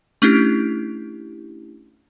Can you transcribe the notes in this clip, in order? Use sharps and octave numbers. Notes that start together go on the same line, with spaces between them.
A3 C#4 D4 E4 G4